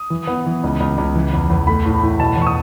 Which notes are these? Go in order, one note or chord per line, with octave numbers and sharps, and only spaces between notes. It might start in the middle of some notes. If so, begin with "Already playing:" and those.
Already playing: D#6
E3
B3
E3
C#2
C#2
C#2
E3
E2
E2
A3 B5
A2
A2
B2 A5
E2 C#6
D#6